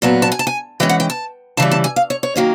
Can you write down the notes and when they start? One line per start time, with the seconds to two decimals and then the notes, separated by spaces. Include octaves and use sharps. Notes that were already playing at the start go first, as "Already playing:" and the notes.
0.02 A#2 F#3 B3 A5
0.22 A5
0.32 G#5
0.39 A5
0.47 G#5
0.80 E3 G#3 C#4 G5
0.89 F#5
1.00 G5
1.10 A5
1.57 C#3 E3 G3 A5
1.71 A5
1.84 G#5
1.96 F5
2.10 C#5
2.23 C#5
2.36 D#3 F#3 A#3 C#4